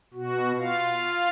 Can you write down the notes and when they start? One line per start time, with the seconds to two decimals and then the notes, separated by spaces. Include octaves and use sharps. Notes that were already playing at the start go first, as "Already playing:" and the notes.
0.14 B2 F#4
0.59 F4 F5